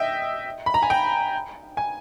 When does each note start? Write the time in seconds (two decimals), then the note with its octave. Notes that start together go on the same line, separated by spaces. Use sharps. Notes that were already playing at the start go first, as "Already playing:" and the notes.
Already playing: D#5 E5 G5
0.66 B5
0.74 A#5
0.83 G#5
0.90 G5
1.77 G#5